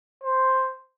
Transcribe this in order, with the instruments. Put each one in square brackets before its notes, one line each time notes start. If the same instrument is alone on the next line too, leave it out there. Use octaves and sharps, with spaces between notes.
[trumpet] C5